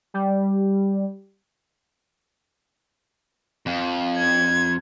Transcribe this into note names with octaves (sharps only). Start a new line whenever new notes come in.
G3
F2
G#6